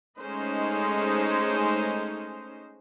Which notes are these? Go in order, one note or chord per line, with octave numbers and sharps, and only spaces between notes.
G#3 A3 C#4 D#4 C5 D#5